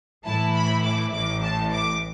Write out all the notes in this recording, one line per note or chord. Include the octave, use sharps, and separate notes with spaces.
A2 E3 A3 E4 A5
B5
D6
A1 A2 E3 D6
A5
D6